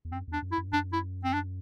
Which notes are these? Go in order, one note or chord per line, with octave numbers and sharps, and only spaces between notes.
E2
F#2 C4
E2
D4
F#2
E4
F#2
G2
F#2 D4
E4
C4
D4